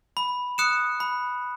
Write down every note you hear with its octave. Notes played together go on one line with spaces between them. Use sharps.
B5
D#6 F#6 C#7 E7
B5